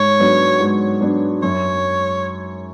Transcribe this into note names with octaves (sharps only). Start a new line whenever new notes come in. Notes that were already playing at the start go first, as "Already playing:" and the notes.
Already playing: G#2 C#5
F#3 B3 D4
G#2
F#3 B3 D4
F#2 C#5